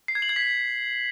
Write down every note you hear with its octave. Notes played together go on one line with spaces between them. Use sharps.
C7
G#6
F#7
G#6
B6